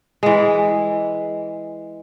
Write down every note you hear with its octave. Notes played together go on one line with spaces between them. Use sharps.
E3 G#3